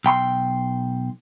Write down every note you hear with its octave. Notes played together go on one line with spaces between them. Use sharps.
B1 G5 B5 C6